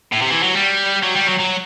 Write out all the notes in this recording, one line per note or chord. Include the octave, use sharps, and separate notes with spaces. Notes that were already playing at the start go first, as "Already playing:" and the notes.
A2
C3
E3
F#3
G3
F#3
G3
F#3
F#3